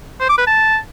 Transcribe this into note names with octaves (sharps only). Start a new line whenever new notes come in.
C5
D6
B4
A5